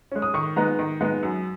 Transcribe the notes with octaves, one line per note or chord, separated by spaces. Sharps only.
G#3 C#4
D#6
D#3 C#6
G#3 B3 D#4 A#5
D#3
G#3 B3 D#4
F#2